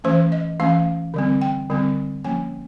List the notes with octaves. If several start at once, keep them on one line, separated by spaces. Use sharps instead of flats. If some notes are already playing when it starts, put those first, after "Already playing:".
E3 A3 C#4 C5
D#5
E3 A3 C#4 F5
D3 G3 C4
G5
D3 G3 C4
F3 A#3 C#4 G#5